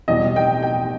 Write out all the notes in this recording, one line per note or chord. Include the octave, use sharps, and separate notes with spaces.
E2 B2 G3 D#5
G5
G5